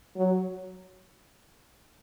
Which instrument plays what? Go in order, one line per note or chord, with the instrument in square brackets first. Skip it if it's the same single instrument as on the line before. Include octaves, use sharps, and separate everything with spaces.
[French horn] F#3